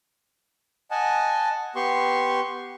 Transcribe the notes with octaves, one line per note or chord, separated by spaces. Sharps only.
D#5 F#5 G#5 A5
B3 G4 C6 C#6